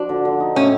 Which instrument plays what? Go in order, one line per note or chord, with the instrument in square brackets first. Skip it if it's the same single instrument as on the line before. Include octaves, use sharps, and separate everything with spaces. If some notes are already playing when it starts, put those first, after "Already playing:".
Already playing: [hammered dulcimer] F3 F#4 [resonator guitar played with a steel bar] D4
[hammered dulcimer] D3
D3
D#4
[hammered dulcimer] A2 [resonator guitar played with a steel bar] C#4